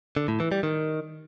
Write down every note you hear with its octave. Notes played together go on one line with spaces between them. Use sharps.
D3
A2
E3
G3
D#3